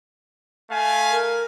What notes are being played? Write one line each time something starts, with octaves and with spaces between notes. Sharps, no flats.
A3 F5 G#5
A#4